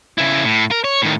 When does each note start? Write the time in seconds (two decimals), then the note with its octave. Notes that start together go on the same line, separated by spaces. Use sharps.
0.18 C#3 E4
0.45 A2
0.71 A#4
0.84 C#5
1.02 A2 D#3